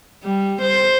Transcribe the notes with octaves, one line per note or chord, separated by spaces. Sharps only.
G3
C5